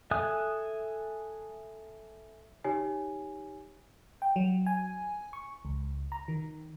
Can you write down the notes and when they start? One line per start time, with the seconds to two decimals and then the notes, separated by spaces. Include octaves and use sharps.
0.11 A4 E5 G#5 D#6 F#6
2.64 D#4 G4 C#5 G#5
4.22 G5
4.36 F#3
4.66 G#5
5.33 C#6
5.65 C#2
6.12 A#5
6.28 D#3